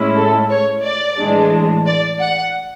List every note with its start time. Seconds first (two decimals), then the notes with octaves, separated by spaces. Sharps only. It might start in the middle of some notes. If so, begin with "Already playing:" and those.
Already playing: A2 G#3 C#4 E4
0.16 A4
0.51 C#5
0.84 D5
1.18 A2 E3 G#3 D4
1.86 D5
2.20 F#5